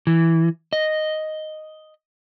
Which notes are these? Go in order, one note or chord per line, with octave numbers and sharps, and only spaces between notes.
E3
D#5